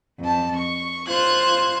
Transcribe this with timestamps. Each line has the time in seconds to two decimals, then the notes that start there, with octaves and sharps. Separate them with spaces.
0.19 F2 A5
0.56 C#6
1.07 F4 C5 F#6 G#6